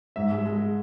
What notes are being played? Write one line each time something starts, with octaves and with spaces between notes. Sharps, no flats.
G#2 E5
G#3
G#3